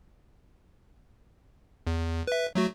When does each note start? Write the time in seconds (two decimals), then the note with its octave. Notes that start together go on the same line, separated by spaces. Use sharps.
1.87 E2
2.27 B4 E5
2.55 F#3 A3 F#4